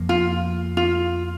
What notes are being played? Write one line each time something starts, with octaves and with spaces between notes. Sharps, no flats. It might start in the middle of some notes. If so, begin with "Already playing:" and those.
Already playing: F2 F3 A#3
F4
F4